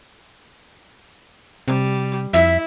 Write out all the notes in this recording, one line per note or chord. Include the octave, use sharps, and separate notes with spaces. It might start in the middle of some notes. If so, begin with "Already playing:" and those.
C3 G3
F2 E4 E5